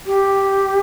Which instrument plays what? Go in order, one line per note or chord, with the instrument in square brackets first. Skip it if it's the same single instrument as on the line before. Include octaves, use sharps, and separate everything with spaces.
[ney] G4